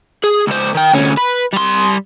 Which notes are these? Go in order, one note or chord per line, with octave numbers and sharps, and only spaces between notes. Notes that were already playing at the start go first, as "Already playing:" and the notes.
G#4
C#2 C5
D#3 G5
D2 C#4
B4
G3 C6